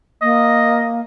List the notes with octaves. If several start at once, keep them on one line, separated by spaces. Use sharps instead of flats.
A#3 D#5